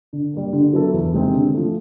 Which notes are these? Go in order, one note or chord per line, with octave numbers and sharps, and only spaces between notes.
D3
G3 A#3
D3
F#3 B3 E4 A4
E2
C3 D#3 G#3 C4
D3
F3 A3